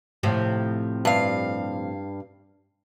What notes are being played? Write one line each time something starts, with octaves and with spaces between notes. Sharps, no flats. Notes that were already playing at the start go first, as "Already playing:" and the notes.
A2 C3 F3
G2 F5